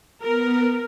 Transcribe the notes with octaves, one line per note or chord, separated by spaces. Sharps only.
B3 A#4